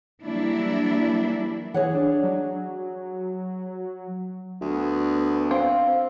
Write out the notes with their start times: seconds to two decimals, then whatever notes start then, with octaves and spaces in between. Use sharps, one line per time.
0.24 E3 F#3 G3 A#3 D4 E4
1.74 E3 G#4 C#5 F#5
1.95 D4
2.23 F#3
4.61 D2 B3
5.51 C4 F5